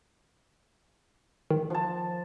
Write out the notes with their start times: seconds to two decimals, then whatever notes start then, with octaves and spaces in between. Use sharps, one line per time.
1.51 D#3
1.70 F3 A5